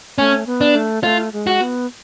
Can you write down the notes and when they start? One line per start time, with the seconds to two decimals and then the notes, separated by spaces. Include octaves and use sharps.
0.18 A3 C#4
0.46 B3
0.61 D4
0.75 A3
1.03 A3 F4
1.33 G#3
1.47 F#4
1.61 B3